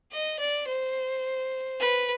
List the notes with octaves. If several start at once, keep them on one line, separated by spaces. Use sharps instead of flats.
D#5
D5
C5
B4